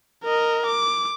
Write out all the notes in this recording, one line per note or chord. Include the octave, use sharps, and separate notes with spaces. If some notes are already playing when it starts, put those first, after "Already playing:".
A#4 D#5
D6